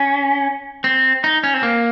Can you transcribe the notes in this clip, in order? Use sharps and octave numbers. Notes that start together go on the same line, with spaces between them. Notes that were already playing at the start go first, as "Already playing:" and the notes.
Already playing: C#4
C4
D#4
C#4
C4
A#3